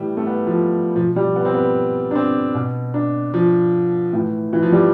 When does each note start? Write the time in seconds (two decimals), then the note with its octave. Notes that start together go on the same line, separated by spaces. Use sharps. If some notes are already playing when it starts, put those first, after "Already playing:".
Already playing: A2 E3 G3
0.17 A3
0.27 B3
0.47 F3
0.96 B2 F3
1.16 G3
1.36 B3
1.45 C4
1.54 B3
2.11 D4
2.15 C4
2.55 B2
2.94 D4
3.34 F3
4.13 A2 E3
4.53 E3
4.63 F3
4.72 G3